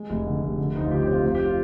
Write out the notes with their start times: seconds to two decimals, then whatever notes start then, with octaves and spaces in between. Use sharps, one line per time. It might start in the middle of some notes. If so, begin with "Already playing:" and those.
Already playing: G#3
0.10 F1
0.26 D3
0.42 F1
0.58 D3
0.75 D2 D#4
0.84 F4
0.91 D3 G4
1.03 G4
1.08 C4 F4
1.23 F1 F4
1.35 G4
1.46 F4